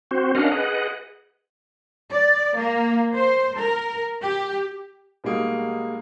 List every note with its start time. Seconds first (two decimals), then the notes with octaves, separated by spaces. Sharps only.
0.11 C4 F#4 C5
0.35 C#4 D4 A#4 D#5 F5 F#5
0.52 G#4 B4 D#5 F#5
2.09 D5
2.56 A#3
3.14 C5
3.57 A#4
4.22 G4
5.24 B1 G3 G#3 A#3 F#4 D#6